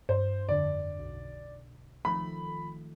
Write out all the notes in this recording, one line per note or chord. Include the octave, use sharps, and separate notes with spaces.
G2 C5
F2 D3 D5
B1
D#3 F3 A3 B5